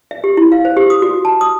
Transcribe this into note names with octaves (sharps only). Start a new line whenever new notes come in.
E5
G4
E4
F5
C5
G4
D#6
F#4
A5
D#6